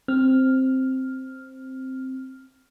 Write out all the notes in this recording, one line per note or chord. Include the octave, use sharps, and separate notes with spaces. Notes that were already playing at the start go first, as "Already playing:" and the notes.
C4 F6